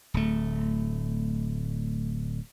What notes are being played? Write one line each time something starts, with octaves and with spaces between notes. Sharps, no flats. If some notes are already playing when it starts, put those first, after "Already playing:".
D1 A3